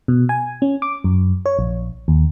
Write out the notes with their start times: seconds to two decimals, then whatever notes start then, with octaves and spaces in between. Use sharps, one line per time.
0.08 B2
0.29 G#5
0.62 C#4
0.82 D6
1.04 F#2
1.46 C#5
1.59 A#1
2.08 D#2